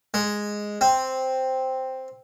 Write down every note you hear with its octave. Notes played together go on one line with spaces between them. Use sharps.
G#3
C4